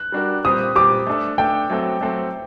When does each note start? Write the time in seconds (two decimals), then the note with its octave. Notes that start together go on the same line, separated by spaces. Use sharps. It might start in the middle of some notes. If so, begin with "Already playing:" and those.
Already playing: F#6
0.12 G3 D4 F#4 A#4
0.44 A#2 G3 C4 G4 C5 D#6
0.75 A#2 G3 C4 G4 C5 D6
1.07 A3 D4 A4
1.38 A3 D4 A4 G5
1.70 F#3 A3 C4 F#4 A4
2.01 F#3 A3 C4 F#4 A4